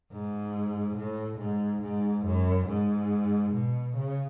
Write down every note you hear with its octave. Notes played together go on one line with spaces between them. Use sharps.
G#2
A2
G#2
G#2
F#2
G#2
B2
C#3